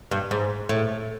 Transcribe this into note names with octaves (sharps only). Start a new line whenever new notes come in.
G2
G#2
A2